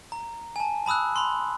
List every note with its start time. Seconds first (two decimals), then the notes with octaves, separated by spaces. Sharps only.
0.12 A#5
0.56 G#5 A5
0.86 A5 B5 D#6 E6 F#6
1.16 B5 C6